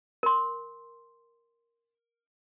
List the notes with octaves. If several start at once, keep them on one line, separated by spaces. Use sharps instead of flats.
A#4 C6